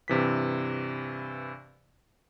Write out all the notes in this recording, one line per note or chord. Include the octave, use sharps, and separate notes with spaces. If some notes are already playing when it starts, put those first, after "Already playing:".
G2 C3 E3 B6